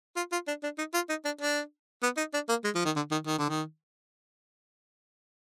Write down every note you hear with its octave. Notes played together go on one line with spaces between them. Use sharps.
F4
F4
D4
D4
D#4
F4
D#4
D4
D4
B3
D#4
D4
A#3
G#3
F3
D#3
D3
D#3
D#3
D3
D#3